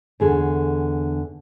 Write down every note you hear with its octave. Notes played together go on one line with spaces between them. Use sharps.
E2 D3 G#4